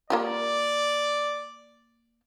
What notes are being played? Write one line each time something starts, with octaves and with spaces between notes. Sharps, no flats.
A#3 F4 G4 D5